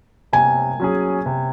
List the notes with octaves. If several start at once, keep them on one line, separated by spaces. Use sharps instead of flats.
C3 G#5
F#3 C#4 G#4
C3